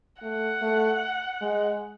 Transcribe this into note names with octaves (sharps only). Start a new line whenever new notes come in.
A3 F#5
A3
G#3